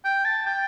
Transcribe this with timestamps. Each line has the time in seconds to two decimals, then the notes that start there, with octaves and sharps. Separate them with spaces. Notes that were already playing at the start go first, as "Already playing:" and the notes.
0.05 G5
0.25 A5
0.47 G5